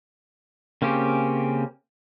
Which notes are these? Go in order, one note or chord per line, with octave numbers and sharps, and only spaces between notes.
C#3 A#3 C4 C#4 G4